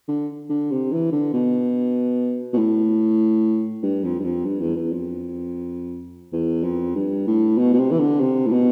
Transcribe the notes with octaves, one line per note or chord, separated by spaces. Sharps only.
D3
D3
C3
E3
D3
B2
B2
A2
G2
F2
G2
F2
G2
E2
E2
F2
E2
F2
G2
A2
B2
B2
C3
E3
D3
C3
A2
B2